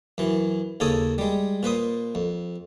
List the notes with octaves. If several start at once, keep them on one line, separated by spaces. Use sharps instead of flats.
F#2 E3
D#2 C#3 A4 C#5 D#6
G3 G#3
A#2 B4 C5 D#6
F2